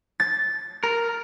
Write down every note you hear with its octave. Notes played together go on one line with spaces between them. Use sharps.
A6
A#4